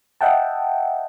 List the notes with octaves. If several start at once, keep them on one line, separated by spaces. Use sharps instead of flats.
D#5 E5 F#5 G5 A5